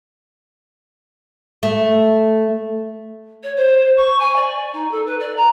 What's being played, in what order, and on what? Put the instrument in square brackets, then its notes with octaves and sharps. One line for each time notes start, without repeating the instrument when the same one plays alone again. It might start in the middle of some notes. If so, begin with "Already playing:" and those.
[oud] A3
[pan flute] C#5
C5
C#6
G#5
D5
D#4
A4
B4
D5
A#5